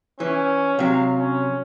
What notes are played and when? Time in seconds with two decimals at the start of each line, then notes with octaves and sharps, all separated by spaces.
0.20 E3 C#4
0.79 C3 F#3 F5
1.18 C#4